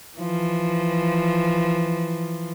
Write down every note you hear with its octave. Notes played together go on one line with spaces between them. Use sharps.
E3 F3